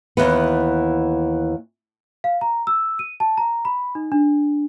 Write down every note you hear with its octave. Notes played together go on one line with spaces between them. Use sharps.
D#2 E3 B3
F5
A#5
E6
D#7
A5
A#5
B5
D#4
D4